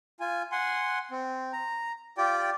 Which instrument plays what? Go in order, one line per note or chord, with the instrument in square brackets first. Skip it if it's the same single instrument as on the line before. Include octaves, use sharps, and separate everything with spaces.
[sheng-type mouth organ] F4 G#5
F#5 G#5 C6
C4
A#5
F4 G4 D5 G5